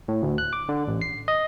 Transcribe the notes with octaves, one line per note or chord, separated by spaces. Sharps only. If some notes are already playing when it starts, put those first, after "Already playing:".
A2
D2
F#6
D6
D3
A1
C7
D#5